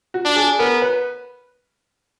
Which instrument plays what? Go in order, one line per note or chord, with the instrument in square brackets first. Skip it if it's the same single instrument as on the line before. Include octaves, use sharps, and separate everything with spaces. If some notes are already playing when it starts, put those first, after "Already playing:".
[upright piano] F#4
[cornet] D4
[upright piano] G#4
[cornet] B3 [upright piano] A#4
[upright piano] B4